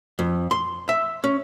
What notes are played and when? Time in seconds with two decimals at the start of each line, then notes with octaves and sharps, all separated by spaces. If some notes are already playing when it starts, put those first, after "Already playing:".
0.19 F2
0.51 C6
0.89 E5
1.24 C#4